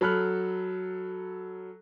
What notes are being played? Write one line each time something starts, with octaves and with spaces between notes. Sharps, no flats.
F#3 A4 B5 F6 F#6